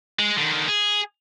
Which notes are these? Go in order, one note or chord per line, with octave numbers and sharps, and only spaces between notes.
G#3
D3 D#3
G#4